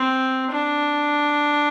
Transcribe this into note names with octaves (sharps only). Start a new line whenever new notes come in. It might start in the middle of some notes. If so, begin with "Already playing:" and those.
Already playing: C4
D4